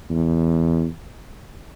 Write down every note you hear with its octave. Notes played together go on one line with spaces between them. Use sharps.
E2